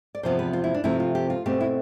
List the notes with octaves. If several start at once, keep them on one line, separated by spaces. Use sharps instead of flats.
D5
E2 C3 F3 B3 C5
B4
F4
E4
D4
C3 F3 A3 C4 E4
F4
G4
F4
B2 A3 C4 G4
E4